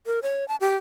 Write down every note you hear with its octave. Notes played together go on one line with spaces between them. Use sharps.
A#4
C#5
A5
G4